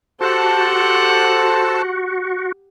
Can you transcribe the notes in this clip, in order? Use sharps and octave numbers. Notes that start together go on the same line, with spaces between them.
F#4 G4 A4 C5 F#5 A5